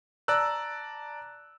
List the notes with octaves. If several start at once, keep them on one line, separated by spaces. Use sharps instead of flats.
D5 A5 A#5 E6 F#6